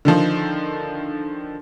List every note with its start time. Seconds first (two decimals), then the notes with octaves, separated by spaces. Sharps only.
0.05 D3 D#3 F3 D#4